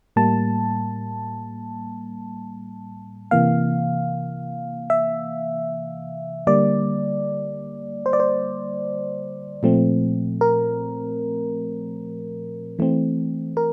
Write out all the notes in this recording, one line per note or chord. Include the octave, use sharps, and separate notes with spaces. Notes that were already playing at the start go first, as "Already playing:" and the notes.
A2 G3 A#3 A5
C3 E3 A#3 F5
E5
D3 G3 A#3 D5
C5
D5
C5
A#2 F3 A3 C4
A#4
E3 A3 C4
A#4